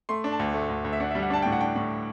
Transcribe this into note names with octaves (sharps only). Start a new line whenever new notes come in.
A3 C6
D4
A5
D2
A3
D2
D2
E5
D4 F#5
G3 E5
F#5
D4 A5
A2 G5
F#5
D4 G5
A2